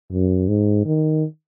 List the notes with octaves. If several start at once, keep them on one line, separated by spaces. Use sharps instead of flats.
F#2
G#2
D#3